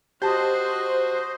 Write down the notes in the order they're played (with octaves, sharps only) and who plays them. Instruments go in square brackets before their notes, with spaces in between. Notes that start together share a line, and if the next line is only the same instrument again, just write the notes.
[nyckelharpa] F#4 D#5 [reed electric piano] G4 A5 [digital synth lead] C5